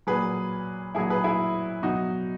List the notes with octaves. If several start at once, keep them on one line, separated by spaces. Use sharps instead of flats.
A#2 F#3 G#4 B4
A#2 F#3 E4 G#4
G#4 B4
E4 G#4
B2 F#3 D#4 F#4